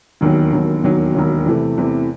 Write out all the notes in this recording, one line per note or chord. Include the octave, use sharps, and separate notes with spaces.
E1 D#2 D#3 F#3
E1 D#2 D#3 F#3
E1 D#2 D#3 F#3
E1 D#2 D#3 F#3
E2 C3 E3 A3
E2 C3 E3 A3